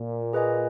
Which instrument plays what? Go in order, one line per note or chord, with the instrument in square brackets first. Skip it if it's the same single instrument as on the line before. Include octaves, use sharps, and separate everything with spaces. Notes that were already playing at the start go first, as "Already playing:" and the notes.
Already playing: [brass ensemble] A#2
[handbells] G#4 B4 D#5 G#5